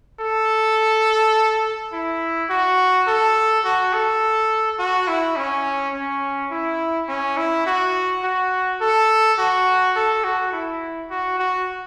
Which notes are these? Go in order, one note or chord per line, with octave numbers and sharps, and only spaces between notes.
A4
E4
F#4
A4
F#4
A4
F#4
E4
C#4
C#4
E4
C#4
E4
F#4
F#4
A4
F#4
A4
F#4
E4
F#4
F#4